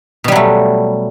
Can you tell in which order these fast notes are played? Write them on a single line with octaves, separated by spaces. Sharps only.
B2 G3 F#3 A3